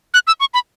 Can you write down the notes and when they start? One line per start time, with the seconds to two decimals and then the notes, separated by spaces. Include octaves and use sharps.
0.14 F#6
0.27 E6
0.40 C#6
0.54 B5